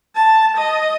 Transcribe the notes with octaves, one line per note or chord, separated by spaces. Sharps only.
A5
D#5